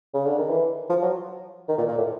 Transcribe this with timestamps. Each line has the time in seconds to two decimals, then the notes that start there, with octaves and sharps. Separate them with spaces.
0.14 C#3
0.26 D3
0.38 D#3
0.50 E3
0.90 F3
1.02 F#3
1.68 D#3
1.78 A#2
1.88 A#2
1.98 A2